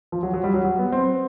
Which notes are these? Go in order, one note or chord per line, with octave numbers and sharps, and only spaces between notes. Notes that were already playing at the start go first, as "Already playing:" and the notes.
F3
F#3
F#3
G3
F#3
F#3
B3
C4